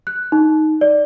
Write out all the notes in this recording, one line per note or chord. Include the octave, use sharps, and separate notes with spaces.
F#6
D#4
D5